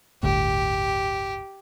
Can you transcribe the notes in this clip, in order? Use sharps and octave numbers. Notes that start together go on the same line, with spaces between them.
G1 D2 A2 G4